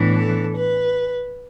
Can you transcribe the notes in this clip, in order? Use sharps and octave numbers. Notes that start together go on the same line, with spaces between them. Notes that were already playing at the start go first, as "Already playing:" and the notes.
Already playing: A2 E3 B3 D4
A4
B4